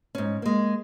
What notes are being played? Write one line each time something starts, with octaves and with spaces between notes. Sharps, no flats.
G#2 C#4
G#3 A#3